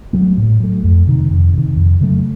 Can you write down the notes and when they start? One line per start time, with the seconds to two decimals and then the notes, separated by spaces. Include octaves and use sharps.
0.13 F#3 A3
0.37 A2
0.60 F#3 A3
0.84 F2
1.07 C3 D#3
1.30 F2
1.54 C3 D#3
1.76 F2
2.01 C#3 F#3 A3